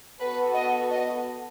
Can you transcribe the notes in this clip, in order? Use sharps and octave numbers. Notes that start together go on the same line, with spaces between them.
B3 F#4 A4 B4
D#5
D#5